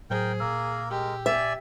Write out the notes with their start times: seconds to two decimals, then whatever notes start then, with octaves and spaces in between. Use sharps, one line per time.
0.10 A2 F#3 G#4 A#4 C5 G5
0.40 A#2 A#3 A#4 E6
0.90 G#3 G4 A#4
1.26 D5 E5 G#5